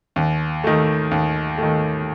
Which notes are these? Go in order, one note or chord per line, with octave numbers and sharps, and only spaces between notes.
D#2
D#3 A3
D#2
D#3 A3